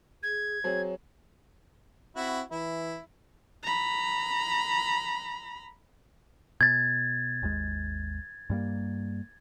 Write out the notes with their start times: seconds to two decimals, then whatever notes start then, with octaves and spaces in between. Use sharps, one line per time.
0.23 G#4 G#6
0.64 F#3 C4 G#4 C#5
2.16 C4 E4 F#4
2.52 E3 E4
3.63 A#5 B5
6.61 B2 G#6 A6
7.42 G#1 D#2 G#3
8.50 G2 G3 A#3